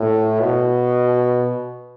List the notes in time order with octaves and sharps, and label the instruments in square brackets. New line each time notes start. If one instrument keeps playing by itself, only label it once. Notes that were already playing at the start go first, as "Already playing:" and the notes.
Already playing: [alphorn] A2
B2